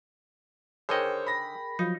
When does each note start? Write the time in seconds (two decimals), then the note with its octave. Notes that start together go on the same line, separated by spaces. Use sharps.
0.89 D3 D#3 G#4 A#4 C5 C#5 D#5 G5
1.27 B5 A#6
1.79 F3 F#3 D#4 F4